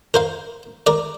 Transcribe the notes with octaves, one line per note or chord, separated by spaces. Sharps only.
A#4 C5 F5
A#4 D5